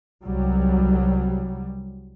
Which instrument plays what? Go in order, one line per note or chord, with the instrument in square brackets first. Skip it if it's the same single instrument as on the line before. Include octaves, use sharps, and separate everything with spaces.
[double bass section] C2 F#3 G3